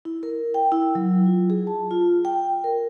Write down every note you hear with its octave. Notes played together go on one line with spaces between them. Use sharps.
E4
A#4
G5
E4
F#3
F4
G#4
A5
F4
G5
A#4